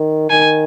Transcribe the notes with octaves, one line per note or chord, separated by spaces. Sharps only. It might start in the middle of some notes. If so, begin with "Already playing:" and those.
Already playing: D#3
D#3 G#5